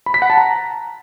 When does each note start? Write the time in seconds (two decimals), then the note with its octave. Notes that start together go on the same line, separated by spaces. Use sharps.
0.06 B5
0.14 B6
0.22 F#5
0.30 A5
0.37 A#5